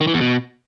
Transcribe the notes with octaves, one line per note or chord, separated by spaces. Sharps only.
D#3
E3
E2
B2